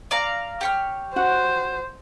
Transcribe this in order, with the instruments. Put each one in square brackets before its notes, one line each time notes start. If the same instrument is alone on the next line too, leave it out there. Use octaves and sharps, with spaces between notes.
[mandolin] D5 F5 A#5
G4 C#5 F6
[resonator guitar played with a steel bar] F#4 F#5 [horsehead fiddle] C5